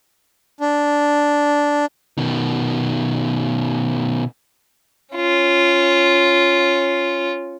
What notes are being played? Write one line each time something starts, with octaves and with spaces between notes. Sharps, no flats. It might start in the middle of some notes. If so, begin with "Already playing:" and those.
D4
B2 D#3
C#4 F4